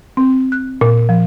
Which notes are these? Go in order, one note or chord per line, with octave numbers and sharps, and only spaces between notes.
C4
F#6
A#2
F3